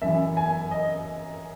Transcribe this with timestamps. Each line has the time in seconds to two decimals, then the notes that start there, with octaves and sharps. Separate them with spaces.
0.02 F#2 E3 E5
0.37 G#5
0.71 D#5